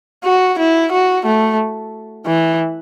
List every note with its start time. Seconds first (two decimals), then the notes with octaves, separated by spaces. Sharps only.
0.24 F#4
0.59 E4
0.92 F#4
1.25 A3
2.26 E3